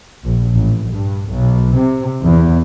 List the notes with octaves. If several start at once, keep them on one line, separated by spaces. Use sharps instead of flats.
A#1
A1
G2
B1
C3
E2